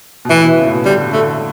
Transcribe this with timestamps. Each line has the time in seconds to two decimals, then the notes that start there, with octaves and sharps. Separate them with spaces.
0.25 B2
0.29 A2 E3
0.43 B2
0.58 C#3
0.66 A2
0.72 B2
0.85 D3 G3
1.13 D3 A3